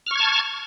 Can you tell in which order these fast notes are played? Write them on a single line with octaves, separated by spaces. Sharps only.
F6 C#6 G#6 A5